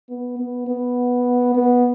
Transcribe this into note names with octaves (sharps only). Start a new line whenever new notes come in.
B3
B3
B3
B3